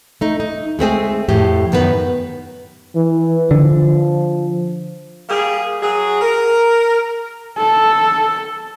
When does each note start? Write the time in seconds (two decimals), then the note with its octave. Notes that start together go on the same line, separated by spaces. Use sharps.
0.21 A3 D#4
0.40 D#4
0.79 G#3 A3 C4 G#4
1.29 F2 A2 G4
1.72 F#2 D#3 B3 F#4 B4
2.96 E3
3.51 D3 F3
5.29 G3 A#3 G#4
5.81 F#3 G#4
6.21 A#4
7.58 A4